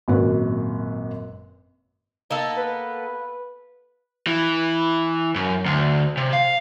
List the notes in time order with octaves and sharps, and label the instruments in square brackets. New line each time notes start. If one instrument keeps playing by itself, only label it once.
[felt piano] G#1 F#2 A#2 F#4 B4
[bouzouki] A#3 B3 A4 [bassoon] D#4
[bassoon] B4
[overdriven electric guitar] E3
F#2
D2
C3
F5